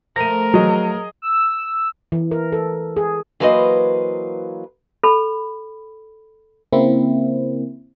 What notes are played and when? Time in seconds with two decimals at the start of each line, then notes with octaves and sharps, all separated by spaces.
0.16 F3 A3 A#4 A#6 D#7
0.54 F#3 G#4 D#5
1.22 E6
2.12 E3
2.31 A#4
2.52 A4
2.97 G#4
3.40 E3 F#3 A#3 B4 C5 D#5
5.03 A4 B5
6.72 C#3 A#3 C4 E4